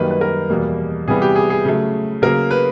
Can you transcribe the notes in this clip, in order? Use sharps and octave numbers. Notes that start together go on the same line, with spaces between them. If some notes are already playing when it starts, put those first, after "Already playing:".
Already playing: F#2 D#3 G3 A#3 B4
B4
A#4
E2 B2 G3 A#3
C3 E3 G3 B3 G#4
G4
G#4
G#4
C#3 F#3 A3
C#3 F#3 A#3 A#4
B4